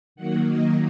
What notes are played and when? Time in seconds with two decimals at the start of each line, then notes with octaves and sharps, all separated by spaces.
0.16 D#3 F#3 A#3 F#5
0.47 D#5